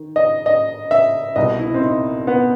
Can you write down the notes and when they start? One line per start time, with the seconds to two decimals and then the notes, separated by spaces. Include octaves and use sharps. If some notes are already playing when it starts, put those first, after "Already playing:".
Already playing: D#3
0.16 D#5
0.46 D#5
0.91 E5
1.36 C2 B2 D#5
1.59 E4
1.74 C4
1.82 D#4
2.27 B3